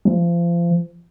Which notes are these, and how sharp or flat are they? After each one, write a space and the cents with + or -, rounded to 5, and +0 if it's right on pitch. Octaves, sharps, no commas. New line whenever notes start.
F3 -30